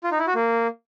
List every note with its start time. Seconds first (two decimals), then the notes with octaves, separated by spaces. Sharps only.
0.04 F4
0.12 D#4
0.19 E4
0.27 F#4
0.35 A#3